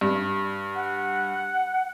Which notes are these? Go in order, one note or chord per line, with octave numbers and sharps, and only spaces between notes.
G2
F#5